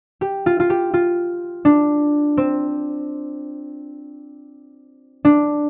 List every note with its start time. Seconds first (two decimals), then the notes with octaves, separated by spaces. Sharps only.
0.21 G4
0.46 F4
0.60 F4
0.70 G4
0.94 F4
1.65 D4
2.37 C4
5.25 D4